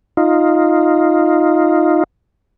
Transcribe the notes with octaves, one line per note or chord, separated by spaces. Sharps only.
D#4 F4